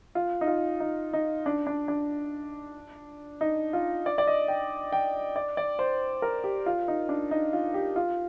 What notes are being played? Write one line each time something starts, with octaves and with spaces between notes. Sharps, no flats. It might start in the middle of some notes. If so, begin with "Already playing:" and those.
F4
D#4
F4
D#4
D#4
D4
D4
D4
D#4
F4
D5
D5
D#5
G5
G5
D5
D5
C5
A#4
G4
F4
D#4
D4
D#4
F4
G4
F4